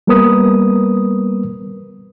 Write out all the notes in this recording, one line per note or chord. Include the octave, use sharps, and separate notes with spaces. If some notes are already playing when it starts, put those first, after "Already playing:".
G3 A#3 B3 A#4 B4 D#6